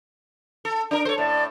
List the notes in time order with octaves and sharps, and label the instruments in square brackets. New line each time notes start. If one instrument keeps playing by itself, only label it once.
[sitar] A4
D4 A#4
[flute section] A4 [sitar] C5 C#5
[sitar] A2 [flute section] D5 A5